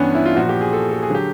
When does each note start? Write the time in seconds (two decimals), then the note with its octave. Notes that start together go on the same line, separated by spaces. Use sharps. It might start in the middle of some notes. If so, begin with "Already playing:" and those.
Already playing: G2 E3 B3 C#4 D4
0.15 E4
0.26 F4
0.36 A#2 F3 F#4
0.49 G4
0.61 G#4
0.73 A4
0.91 A4
1.03 G#4
1.10 D3 F#3 G4